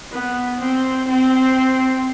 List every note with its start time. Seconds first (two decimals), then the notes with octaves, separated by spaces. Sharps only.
0.12 B3
0.59 C4
1.08 C4